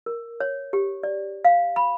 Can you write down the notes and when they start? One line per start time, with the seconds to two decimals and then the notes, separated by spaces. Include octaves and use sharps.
0.06 A#4
0.40 C#5
0.73 G4
1.03 D5
1.45 F5
1.76 B5